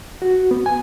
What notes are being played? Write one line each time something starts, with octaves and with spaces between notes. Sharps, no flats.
F#4
B3
G#5